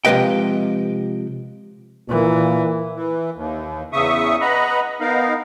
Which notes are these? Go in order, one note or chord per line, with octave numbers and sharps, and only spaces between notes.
C3 F3 G#3 B4 D#5 G5
A#2 E3
E3
D#2
E2 C#3 E5 C#6 D#6
B4 D#5 F#5 A#5 B5
B3 D#4 A#4 F5